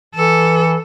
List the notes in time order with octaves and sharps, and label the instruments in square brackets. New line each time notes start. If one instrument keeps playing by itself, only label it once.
[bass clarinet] E3 [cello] A4